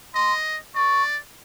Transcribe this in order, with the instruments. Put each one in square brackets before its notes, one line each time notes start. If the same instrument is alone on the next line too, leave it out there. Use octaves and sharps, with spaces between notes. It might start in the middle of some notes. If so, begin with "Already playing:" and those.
[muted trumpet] D#5 [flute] C6
[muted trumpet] D5 [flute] C#6